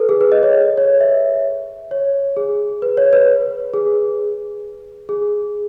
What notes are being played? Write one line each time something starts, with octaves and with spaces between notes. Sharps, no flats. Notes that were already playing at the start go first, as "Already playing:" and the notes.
Already playing: A4 B4
G#4
B4
D#5
C#5
C#5
E5
C#5
G#4
B4
C#5
B4
G#4
G#4